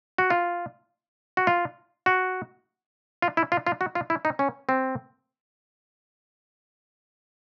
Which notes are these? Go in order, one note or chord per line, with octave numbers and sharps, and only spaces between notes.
F#4
F4
F#4
F4
F#4
F4
E4
F4
F4
F#4
F4
E4
D#4
C#4
C4